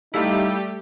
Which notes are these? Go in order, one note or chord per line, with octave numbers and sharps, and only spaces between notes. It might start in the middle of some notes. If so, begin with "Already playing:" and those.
G3 A3 D#4 E4 G4 F5